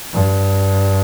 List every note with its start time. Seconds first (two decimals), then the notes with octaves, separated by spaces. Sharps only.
0.13 G2